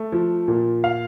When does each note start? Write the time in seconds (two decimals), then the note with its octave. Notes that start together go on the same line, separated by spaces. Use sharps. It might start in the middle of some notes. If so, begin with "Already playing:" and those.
Already playing: A3
0.12 F3
0.48 A#2
0.84 F5